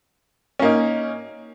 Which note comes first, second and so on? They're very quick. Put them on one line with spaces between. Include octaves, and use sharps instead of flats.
C#4 A#3 D#4